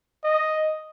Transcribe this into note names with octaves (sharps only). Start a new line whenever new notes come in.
D#5